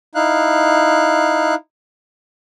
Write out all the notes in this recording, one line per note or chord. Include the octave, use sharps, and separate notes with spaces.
D#4 E4 F5 F#6